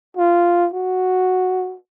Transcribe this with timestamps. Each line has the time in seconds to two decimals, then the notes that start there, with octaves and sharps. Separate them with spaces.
0.17 F4
0.74 F#4